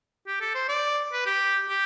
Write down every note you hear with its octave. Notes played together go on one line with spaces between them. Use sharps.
G4
A4
C5
D5
B4
G4
G4